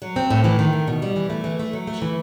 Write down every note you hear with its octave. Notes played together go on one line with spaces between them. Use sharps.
F#3
C4
A2
E3
D#3
A3
B2
G3
E3
A3
E3
A3
F#3
A3
E3